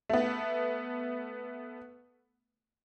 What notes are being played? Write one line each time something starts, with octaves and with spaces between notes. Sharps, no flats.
A3 B3